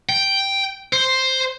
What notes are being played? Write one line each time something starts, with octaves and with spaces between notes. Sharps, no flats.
G5
C5